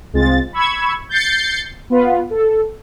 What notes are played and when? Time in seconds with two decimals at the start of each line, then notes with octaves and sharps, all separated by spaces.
0.13 C2 G#3 C4 F4 A6
0.53 B5 C#6 E6 G#6
1.09 G6 A6 C7 C#7
1.90 B3 F4 B4
2.30 A4